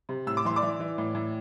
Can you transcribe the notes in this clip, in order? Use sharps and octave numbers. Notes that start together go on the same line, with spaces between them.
C3
A2 E6
D6
E3 C6
D5 D6
E3
E3
A2
A2